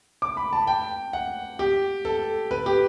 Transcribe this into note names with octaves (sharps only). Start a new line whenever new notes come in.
D6
B5
A5
G5
F#5
G4
A4
B4
G4